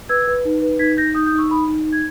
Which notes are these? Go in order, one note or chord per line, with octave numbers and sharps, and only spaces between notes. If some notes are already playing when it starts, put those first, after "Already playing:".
B4 E6 G#6
B4
D#4
B4
D#4 G#6 B6
D#4 G6 A#6
D#4 D#6 G6
D#6 G6
D#4
C#6 E6
D#4 B5 D#6
D#4
D#4
G#6